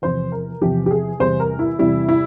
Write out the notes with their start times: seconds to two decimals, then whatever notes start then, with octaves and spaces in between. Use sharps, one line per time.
0.02 E2 C3 F3 C5
0.32 A#4
0.61 E2 C3 F3 G4
0.86 G4
0.91 G#4
1.20 E2 C3 G3 C5
1.40 A#4
1.59 E4
1.79 E2 C3 G3 E4
2.09 E4